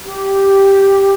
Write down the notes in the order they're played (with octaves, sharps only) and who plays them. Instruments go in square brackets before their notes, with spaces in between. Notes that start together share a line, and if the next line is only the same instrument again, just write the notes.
[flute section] G4